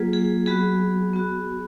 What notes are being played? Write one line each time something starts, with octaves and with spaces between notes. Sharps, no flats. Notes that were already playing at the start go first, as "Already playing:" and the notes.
Already playing: F#3 A#3 F4 G#4
G#4
F#3 B3 F#4 G#4
B3 F#4